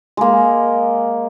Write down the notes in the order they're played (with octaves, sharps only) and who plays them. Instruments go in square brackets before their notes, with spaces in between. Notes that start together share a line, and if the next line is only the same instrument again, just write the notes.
[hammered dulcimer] G#3 A#3